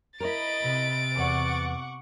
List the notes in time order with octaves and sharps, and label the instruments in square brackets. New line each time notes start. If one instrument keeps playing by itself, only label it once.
[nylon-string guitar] E4 A#4 [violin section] D#5 B5 [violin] A6 D7
[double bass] C3
[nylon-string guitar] E2 [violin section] F#5 C#6 D6